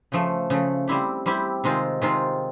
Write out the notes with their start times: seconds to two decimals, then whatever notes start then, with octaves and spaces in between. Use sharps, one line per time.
0.12 C#3 F3 A3
0.50 C#3 F3 A3
0.87 G3 C4 E4 G4
1.26 G3 C4 E4 G4
1.64 C3 D#3 G#3 C4 F4
2.02 C3 D#3 G#3 C4 F4